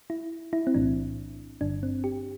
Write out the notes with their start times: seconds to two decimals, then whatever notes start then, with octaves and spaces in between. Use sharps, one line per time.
0.10 E4
0.53 E4
0.67 C4
0.74 B1 A2 E3 D4
1.61 G1 G2 D3 D4
1.83 C4
2.04 G4